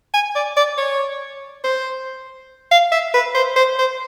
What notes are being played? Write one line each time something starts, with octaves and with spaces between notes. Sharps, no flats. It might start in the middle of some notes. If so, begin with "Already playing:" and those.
G#5
D5
D5
C#5
C5
F5
E5
B4
C5
C5
C5